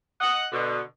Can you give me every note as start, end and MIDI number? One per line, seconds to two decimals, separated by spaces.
0.21 0.45 75
0.21 0.45 78
0.53 0.79 47
0.53 0.79 50